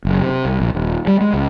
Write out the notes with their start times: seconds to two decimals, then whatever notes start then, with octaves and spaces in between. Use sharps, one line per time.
0.05 F#1
0.21 C3
0.45 C2
0.60 A#1
0.74 D#1
1.07 G3
1.21 G#3
1.33 C#2